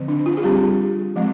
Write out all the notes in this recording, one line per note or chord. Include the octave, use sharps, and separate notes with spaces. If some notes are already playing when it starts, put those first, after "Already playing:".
Already playing: D3 F3 C4
D4
F4
G#4
G3 C4 G4
F3 G#3 C4